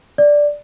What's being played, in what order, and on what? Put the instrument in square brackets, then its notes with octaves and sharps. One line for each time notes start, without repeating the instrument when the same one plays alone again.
[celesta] D5